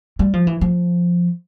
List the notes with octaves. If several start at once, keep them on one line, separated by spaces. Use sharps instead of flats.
G3
F3
E3
F3